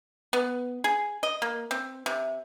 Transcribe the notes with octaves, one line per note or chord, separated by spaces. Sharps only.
B3
G#4
D#5
A#3
C4
C3